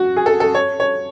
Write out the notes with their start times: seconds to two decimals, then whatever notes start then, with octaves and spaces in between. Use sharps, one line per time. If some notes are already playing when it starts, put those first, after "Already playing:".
Already playing: F#4
0.16 G#4
0.26 A4
0.40 A4
0.55 C#5
0.80 C#5